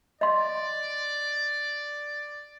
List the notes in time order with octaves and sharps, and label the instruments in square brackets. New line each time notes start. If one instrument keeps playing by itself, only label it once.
[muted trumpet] D5 [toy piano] D#5 C6